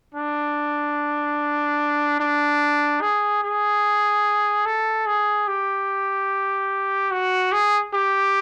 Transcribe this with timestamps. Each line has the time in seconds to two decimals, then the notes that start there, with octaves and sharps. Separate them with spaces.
0.15 D4
2.20 D4
3.02 G#4
3.43 G#4
4.66 A4
5.07 G#4
5.48 G4
7.11 F#4
7.52 G#4
7.94 G4